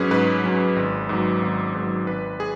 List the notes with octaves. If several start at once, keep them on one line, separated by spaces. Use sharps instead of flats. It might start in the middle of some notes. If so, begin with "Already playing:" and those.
Already playing: G#2 F#3 C#4 G#4 B4
G#2 B4
F#3 C#4
G#1
G#2 F#3
G#1
G#2 F#3
G#1 B4
G#4